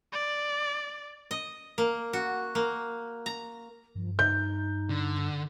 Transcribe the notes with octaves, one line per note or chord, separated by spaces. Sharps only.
D5
D#5
A#3
F#4
A#3
A#5
G2 F3
D#4 G6
D3